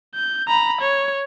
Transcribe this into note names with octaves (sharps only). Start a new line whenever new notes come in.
G6
A#5 B5
C#5